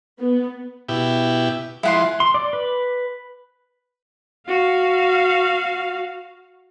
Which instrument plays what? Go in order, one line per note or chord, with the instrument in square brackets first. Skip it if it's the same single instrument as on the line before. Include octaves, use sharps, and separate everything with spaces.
[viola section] B3
[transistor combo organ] B2 E4 G4
[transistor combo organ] F3 G#3 [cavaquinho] E4 F#5 C6
[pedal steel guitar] C6
D5
B4
[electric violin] F#4 F5